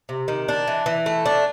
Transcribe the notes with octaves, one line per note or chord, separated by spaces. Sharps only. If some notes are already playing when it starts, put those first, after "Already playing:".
C3
D#3
D4
E3
E3
A3
D4